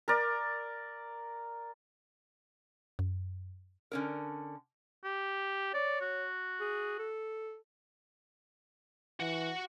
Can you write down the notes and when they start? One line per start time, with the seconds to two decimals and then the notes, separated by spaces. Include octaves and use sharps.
0.08 A#4 D5
2.99 F#2
3.92 D3 C#4 A#4
5.04 G4
5.74 C#5 D5
6.01 F#4
6.60 G#4
6.99 A4
9.20 E3 F#4 F#5